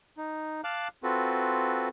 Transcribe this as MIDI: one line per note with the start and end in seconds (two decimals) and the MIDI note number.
0.17 0.61 63
0.64 0.88 77
0.64 0.88 81
0.64 0.88 86
0.64 0.88 89
0.64 0.88 90
1.03 1.89 60
1.03 1.89 65
1.03 1.89 66
1.03 1.89 69
1.03 1.89 71